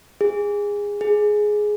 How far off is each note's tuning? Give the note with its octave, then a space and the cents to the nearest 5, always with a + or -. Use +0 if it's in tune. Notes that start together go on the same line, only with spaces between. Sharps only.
G#4 -20
G#4 +10